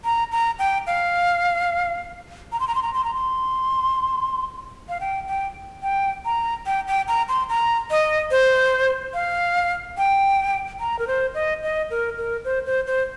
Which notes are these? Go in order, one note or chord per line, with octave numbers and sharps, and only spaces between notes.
A#5
A#5
G5
F5
A#5
C6
A#5
C6
A#5
C6
A#5
C6
F5
G5
G5
G5
A#5
G5
G5
A#5
C6
A#5
D#5
C5
F5
G5
A#5
A#4
C5
D#5
D#5
A#4
A#4
C5
C5
C5